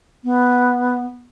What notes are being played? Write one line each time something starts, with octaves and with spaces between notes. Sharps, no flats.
B3